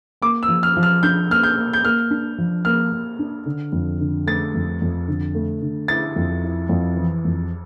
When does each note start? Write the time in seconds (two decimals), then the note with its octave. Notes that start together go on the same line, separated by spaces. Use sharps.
0.22 A#3 D6
0.43 E6
0.49 F3
0.63 F6
0.77 F3
0.83 F6
1.03 D4 G6
1.30 A#3 F6
1.43 G6
1.57 A#3
1.73 G6
1.84 A#3 F6
2.11 D4
2.38 F3
2.65 A#3 F6
2.92 A#3
3.19 D4
3.46 D3
3.72 F2
4.00 D3
4.26 A3 A6
4.54 F2
4.82 F2
5.08 D3
5.35 A3
5.62 D3
5.88 E4 A6
6.16 F2
6.44 E4
6.69 F2
6.97 E3
7.25 F2